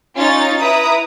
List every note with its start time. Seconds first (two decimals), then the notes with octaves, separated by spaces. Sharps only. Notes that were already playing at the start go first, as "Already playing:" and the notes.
0.15 C#4 D#4 F4 C#5 A6
0.59 E4 B4 A#5 D#6